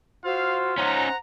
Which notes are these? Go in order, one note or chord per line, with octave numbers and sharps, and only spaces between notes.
F4 F#4 C5 F5 E6
C#4 D#4 C5 F#5 A#5 F#6